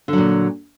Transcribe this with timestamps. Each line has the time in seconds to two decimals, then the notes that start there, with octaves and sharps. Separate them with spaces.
0.08 D3
0.13 F#3
0.18 A#2